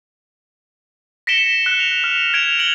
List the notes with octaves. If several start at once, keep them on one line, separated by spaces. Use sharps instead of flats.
A#6 B6 C#7 D7 E7 G7
F#6
F7
F6
G#6 D7 F7
D7 F#7 G7